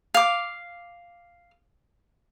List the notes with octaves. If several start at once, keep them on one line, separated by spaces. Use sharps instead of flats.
F5 D6